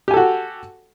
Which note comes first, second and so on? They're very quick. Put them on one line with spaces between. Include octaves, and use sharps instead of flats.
G4 G#5 A4 F#4